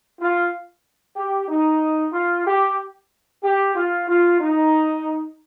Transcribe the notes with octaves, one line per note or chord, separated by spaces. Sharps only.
F4
G4
D#4
F4
G4
G4
F4
F4
D#4